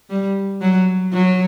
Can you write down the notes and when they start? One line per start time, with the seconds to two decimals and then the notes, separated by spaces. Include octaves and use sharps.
0.10 G3
0.61 F#3
1.13 F#3